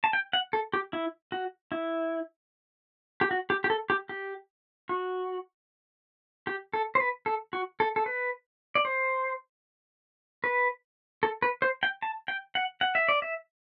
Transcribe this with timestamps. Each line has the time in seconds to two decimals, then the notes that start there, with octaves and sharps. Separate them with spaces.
0.04 A5
0.13 G5
0.33 F#5
0.53 A4
0.73 G4
0.93 E4
1.32 F#4
1.72 E4
3.21 G4
3.31 F#4
3.50 G4
3.64 G4
3.70 A4
3.90 G4
4.09 G4
4.89 F#4
6.47 G4
6.74 A4
6.95 C5
7.00 B4
7.26 A4
7.53 F#4
7.80 A4
7.96 A4
8.06 B4
8.75 D5
8.85 C5
10.44 B4
11.23 A4
11.42 B4
11.62 C5
11.83 G5
12.02 A5
12.28 G5
12.55 F#5
12.81 F#5
12.95 E5
13.09 D5
13.22 E5